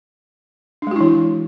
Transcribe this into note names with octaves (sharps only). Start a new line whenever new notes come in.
E3 G#3 D4 E4 F#4